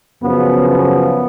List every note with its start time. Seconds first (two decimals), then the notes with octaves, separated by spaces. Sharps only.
0.22 F#2 C#3 F3 B3
0.68 B3